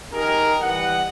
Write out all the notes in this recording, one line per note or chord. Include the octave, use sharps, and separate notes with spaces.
D#4 G4 G#4 A#4
E3 G3 D#5 F#5